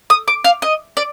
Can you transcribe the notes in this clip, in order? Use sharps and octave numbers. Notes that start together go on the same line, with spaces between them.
D#6
D6
F5
D#5
D5